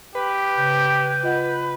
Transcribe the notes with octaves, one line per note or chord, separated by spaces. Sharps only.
G4 B4
C#3 G6
F4 D#5 F#5